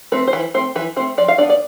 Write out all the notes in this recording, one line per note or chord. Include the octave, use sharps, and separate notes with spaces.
A3 C4 B4
C5
E3 B4
A3 C4 C5
E3 B4
A3 C4 C5
F3 D5
F5
B3 D4 D5
D5